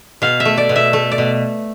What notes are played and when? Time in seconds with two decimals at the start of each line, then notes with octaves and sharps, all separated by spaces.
0.22 B2 F5
0.40 E5
0.45 A3
0.57 D5
0.69 B2
0.76 E5
0.93 A3
1.11 D5
1.18 B2